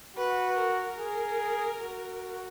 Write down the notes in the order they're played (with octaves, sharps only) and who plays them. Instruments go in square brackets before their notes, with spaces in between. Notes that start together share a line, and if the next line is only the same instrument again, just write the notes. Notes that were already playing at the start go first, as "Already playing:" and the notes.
[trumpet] F#4 [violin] B4
[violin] A#4
[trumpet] G#4
F#4